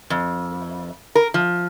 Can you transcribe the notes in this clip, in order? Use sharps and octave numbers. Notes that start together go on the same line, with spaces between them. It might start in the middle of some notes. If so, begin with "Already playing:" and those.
F2
A#4
F3